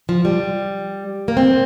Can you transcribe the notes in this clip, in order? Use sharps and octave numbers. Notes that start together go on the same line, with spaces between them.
F3
G3
A#3
C4